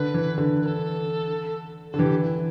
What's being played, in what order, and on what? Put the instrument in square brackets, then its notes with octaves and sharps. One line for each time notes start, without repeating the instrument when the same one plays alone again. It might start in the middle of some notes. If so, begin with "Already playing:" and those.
Already playing: [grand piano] D3 [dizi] B4
[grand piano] E3
D3
[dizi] B4
A4
A4
[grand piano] D3
[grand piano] E3 [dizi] G4
[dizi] E4